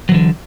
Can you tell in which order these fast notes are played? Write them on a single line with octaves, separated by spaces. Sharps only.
F#3 E3 D3